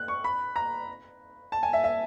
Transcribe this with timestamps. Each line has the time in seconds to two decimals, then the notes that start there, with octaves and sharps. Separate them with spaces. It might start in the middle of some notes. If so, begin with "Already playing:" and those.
Already playing: F#6
0.08 C#6
0.24 B5
0.56 A#5
1.52 A5
1.63 G#5
1.73 E5
1.84 E5